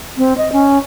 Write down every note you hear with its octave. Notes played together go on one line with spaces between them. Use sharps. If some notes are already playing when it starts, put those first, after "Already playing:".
C4
D#5
C#4